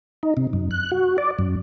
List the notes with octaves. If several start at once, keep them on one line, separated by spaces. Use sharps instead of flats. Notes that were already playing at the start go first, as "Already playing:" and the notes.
D#4
C3
F#2
F#6
F#4
D5
F#2